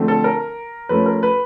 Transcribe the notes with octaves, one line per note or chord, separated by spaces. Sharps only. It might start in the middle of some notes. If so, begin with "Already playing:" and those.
Already playing: D3 F3 A3 C4
A4
A#4
F3 A3 C#4 B4
A#4
B4